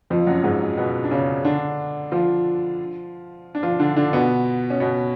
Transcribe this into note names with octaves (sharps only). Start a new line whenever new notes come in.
F2 F3
F#2 F#3
G#2 G#3
B2 B3
D4
C#3 C#4
D3 D4
F3 F4
D4
F3 F4
D3 D4
D3 D4
B2 B3
C#4
B2 B3